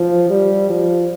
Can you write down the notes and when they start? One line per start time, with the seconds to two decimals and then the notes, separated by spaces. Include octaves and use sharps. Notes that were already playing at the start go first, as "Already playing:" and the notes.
Already playing: F3
0.30 G3
0.70 F3